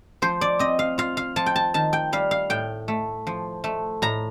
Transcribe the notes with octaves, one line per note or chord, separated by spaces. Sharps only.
F3 C5
D5
C4 D#5
F5
F4 F5
F5
F3 A5
G5
A5
D#3 A5
G5
G3 F5
F5
A2 G5
A3
F3
A3
A2 A#5